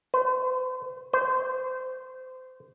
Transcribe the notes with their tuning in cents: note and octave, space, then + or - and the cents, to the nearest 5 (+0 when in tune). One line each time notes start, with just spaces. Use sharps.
C5 -45
C5 -25